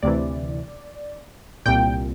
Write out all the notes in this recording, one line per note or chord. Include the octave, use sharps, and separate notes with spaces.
D2 C3 E3 D5
C2 A#2 G5